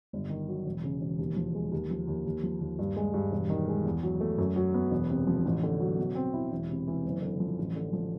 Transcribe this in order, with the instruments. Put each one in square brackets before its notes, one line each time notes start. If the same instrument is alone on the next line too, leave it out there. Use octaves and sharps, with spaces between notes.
[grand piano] G1
D#3
F#3
E1
C#3
E1
D#2
F3
G#3
D#2
F3
D#2
D#2
F3
D#2
G2
G#3
G2
E1
D#3
G#3
E2
F#3
A3
F#2
F#3
B3
E1
C3
F3
A1
D3
F#3
B2
C4
E4
E1
C3
E3
F#1
D3
F3
A1
D3
F3